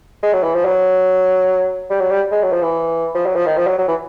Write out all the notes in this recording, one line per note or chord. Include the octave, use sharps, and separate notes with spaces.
G#3
F#3
E3
F3
F#3
G3
F#3
G3
G#3
F#3
F3
E3
F3
F#3
F3
D#3
F3
F#3
F#3
E3